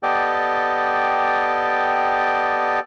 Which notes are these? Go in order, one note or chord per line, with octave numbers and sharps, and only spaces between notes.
B3 G4 A4 D5 D#5 G5